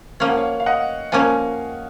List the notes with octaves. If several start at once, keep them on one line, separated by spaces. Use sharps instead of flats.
F3 A#3 C#4 F5
F#5
C#5 F5
F5
D#5 F#5
F3 A#3 C#4 F5 G#5